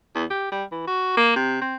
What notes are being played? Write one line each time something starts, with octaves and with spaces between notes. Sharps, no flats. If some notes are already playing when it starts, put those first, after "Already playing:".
E2
G4
G3
E3
F#4
A#3
C3
C4